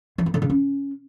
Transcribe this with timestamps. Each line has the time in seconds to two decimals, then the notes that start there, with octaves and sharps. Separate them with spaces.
0.18 E3
0.26 A#3
0.34 D3
0.42 C#3
0.50 C#4